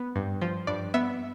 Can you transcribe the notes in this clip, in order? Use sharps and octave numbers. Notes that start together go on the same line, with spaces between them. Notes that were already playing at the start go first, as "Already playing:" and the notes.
Already playing: B3
G2
F3
G2 D5
B3 E5